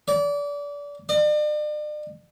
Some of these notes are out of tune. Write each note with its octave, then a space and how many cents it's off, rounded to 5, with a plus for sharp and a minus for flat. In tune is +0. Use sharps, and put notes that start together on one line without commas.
D5 -30
D5 +40